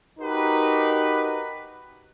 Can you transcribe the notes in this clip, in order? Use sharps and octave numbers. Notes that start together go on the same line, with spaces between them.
D#4 F#4 G4 A#4 B4